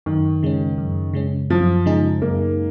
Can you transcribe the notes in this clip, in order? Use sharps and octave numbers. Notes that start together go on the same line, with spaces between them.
F#2 D#3
C#3 G#3 C#4
F#2
C#3 G#3 C#4
F#2 F3
C#3 G#3 D#4 G#4
F#2 A#3